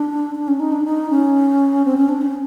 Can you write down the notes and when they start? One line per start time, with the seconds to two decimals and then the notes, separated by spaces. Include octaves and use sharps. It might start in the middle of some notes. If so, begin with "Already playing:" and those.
Already playing: D4
0.35 D4
0.48 C#4
0.60 D#4
0.72 D4
0.84 D#4
1.10 C#4
1.85 C4
1.97 C#4
2.09 D4
2.21 C#4